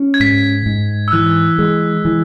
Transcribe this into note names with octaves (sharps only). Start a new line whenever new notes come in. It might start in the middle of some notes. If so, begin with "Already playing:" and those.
Already playing: C#4
G#6
G#2 B6
G#2
E6
E3 F#6
G#3
E3